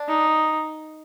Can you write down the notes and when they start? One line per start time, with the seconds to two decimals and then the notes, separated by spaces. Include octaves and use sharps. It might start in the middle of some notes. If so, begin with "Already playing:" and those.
Already playing: D4
0.08 D#4